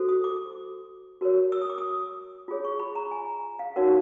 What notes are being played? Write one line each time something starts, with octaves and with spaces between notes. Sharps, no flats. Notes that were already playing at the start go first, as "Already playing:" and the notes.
Already playing: F#4 A4 C5
D#6
D6
F#4 A#4 C#5
E6
D#6
D6
D#6
F4 G#4 C#5
C#6
B5
A#5
G#5
F5
D#4 F#4 A#4 C#5 F#5